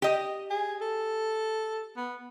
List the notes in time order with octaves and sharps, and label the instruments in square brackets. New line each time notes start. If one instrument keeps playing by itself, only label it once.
[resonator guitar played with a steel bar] G4 D#5
[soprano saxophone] G#4
A4
B3